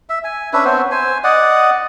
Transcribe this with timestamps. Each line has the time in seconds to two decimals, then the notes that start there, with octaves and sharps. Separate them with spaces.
0.10 E5
0.24 G#5
0.53 C#4 D4 B4 E5
0.65 B3 C4 C5 C#5
0.91 C5 G#5
1.24 D5 D#5 F#5